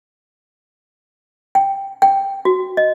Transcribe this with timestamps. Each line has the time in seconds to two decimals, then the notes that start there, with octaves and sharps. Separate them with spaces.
1.55 G5
2.02 G5
2.45 F#4
2.77 D#5